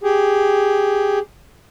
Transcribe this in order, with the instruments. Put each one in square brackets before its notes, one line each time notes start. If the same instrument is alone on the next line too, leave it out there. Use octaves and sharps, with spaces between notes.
[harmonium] G4 G#4